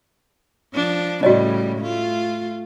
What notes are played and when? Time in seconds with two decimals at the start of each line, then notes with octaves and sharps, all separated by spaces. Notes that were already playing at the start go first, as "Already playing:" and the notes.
0.74 F3 D4
1.23 A2 C#3 G3 F#4 D5 D#5
1.78 A3 F4